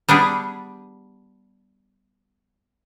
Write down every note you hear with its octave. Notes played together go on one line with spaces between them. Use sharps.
G3 B3 D4 G#4